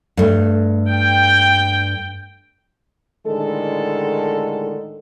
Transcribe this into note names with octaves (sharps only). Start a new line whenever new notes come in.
G2 A3
G5
A2 D3 D#3 G#3 A4